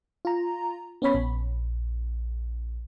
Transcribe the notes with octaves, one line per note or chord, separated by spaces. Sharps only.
F4 A#5
B3 C#4 C#5 B5
A#1